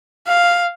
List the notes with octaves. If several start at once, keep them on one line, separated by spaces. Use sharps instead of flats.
F5